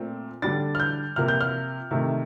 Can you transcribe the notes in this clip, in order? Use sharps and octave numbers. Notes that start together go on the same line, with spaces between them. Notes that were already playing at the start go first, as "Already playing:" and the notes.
Already playing: A#2 A3 C4
D3 G3 D4 A6
F6
G6
C3 F3 A#3 F6
G6
F6
C3 D#3 A3